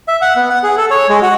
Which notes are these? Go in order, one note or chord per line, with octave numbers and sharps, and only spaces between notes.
E5
F#5
B3
F#5
G#4
A4
C#5
G#3
F#4